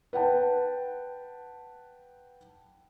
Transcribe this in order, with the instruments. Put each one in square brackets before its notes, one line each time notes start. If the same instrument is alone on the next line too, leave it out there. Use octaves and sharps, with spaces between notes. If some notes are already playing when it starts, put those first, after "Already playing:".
[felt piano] B4 F#5 G5 A5